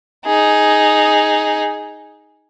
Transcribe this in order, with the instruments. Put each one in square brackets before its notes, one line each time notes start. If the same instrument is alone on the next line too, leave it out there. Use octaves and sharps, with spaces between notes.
[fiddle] D#4 G#4